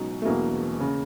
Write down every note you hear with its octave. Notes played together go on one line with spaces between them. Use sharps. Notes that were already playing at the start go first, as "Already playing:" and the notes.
Already playing: C#2 B2 F#3 D#4
A3
E1 E2 B2 F#3 A#3
C#3